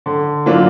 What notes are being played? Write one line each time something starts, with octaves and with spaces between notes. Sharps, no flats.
D3
F#3 A#3 D4 F4